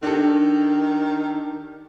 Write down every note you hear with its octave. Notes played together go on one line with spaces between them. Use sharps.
D#3 D4 G4 A4